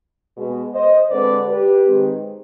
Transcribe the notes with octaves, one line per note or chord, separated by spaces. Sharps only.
B2 G#3 B3
C5 D#5
D3 G#3 C4 B4 D5
G4 B4
D#3 G#3 C4